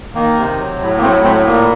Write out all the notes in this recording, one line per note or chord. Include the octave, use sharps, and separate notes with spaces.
D#3 A#3
C3
F#3
A2
A#3
F#3 A3 C4
A2 A3 C4
A#2 A#3